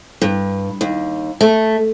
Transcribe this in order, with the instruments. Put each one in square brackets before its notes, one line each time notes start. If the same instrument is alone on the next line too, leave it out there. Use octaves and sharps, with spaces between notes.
[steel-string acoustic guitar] G2
D#2
A3